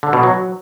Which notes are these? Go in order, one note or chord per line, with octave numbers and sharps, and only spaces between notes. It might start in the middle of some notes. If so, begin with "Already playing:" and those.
D3
B2
F#3